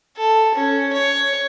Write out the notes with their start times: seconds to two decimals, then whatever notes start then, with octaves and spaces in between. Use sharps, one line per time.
0.17 A4
0.55 C#4
0.93 C#5